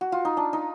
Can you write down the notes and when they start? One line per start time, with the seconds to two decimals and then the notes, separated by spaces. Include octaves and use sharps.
0.01 F#4
0.12 F4
0.25 D#4
0.37 D4
0.53 D#4